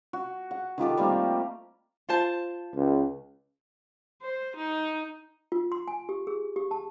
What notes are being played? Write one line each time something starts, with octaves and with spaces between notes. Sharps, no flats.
F#4
F#5
D#3 F4 G4 A4
G3 A3 A#3 C4
F4 C5 A5
C#2
C5
D#4
F4
C6
G#5
G4
G#4
G4
A5